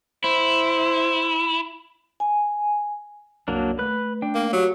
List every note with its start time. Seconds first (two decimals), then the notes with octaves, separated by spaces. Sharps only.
0.24 E4 C5
2.20 G#5
3.48 C2 F#2 F#3 A#3 D4
3.79 A3 B4 F#6
4.22 D4 G5
4.35 A#3
4.53 F#3 G4